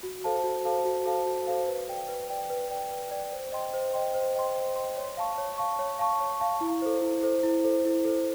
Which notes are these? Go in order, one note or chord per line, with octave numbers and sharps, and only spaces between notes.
F#4
A4 C5 F5 A5
F#4
A4 C5 F5 A5
F#4
A4 C5 F5 A5
F#4
A4 C5 F5 A5
B4
D5 G5
B4
D5 G5
B4
D5 G5
B4
D5 G5
C5
D#5 G5 C6
C5
D#5 G5 C6
C5
D#5 G5 C6
C5
D#5 G5 C6
C#5
F5 A5 C#6
C#5
F5 A5 C#6
C#5
F5 A5 C#6
C#5
F5 A5 C#6
E4
A4 C5
E4
A4 C5
E4
A4 C5
E4
A4 C5